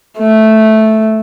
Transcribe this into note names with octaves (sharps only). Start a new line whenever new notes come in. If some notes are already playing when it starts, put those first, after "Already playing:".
A3